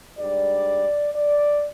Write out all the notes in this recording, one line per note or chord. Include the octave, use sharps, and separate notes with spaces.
G#2 G3 D4 D5
D5